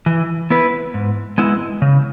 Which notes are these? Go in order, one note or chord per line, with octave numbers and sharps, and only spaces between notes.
E3
B3 E4 B4
G#2
G#3 B3 E4
C#3